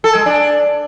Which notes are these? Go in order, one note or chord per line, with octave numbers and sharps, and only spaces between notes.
A4
G#3
D4